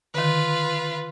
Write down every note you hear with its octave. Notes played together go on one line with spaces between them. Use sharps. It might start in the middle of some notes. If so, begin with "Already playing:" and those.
D3 D#3 F4 B4